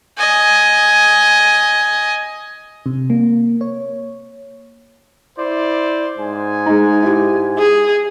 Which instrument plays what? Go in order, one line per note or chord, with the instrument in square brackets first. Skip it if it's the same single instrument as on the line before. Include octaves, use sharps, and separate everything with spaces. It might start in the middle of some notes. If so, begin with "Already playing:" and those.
[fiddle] D#5 G#5
[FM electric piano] C3
A#3
C#5
[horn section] E4 C5 D5
G#2 G#5
[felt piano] G#3 D#4
E4 G4
[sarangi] G#4